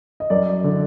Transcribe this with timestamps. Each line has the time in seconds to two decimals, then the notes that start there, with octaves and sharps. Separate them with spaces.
0.20 D#5
0.30 F#2 D5
0.64 D3